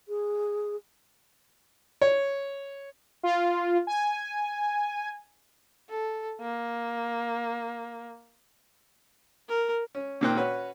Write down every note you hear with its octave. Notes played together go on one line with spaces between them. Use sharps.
G#4
C#5
F4
G#5
A4
A#3
A#4
C#4
A#2 D#3 A#3 C4 G5 F#6
C#4 F#4 B4 C#5